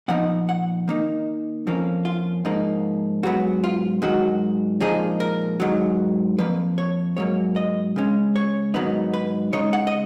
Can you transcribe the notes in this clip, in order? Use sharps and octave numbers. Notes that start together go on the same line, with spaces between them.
A#2 F3 B3 D#4 F#5
F#5
D#3 A#3 D#4
F2 F3 A#3 C#4
F4
G#2 F3 A#3 D#4
G#2 F#3 B3 F#4
F4
G#2 D#3 F#3 F#4
A#2 F3 G#3 D#4 G#4
A#4
G#2 D#3 F#3
F2 F3 A#3 B4
C#5
G#2 F#3 A#3 C#5
D#5
C#3 G#3 C#4
C#5
G#2 D#3 F#3 B3 D#4
B4
C#3 G#3 D#4 C#5
F#5
D#5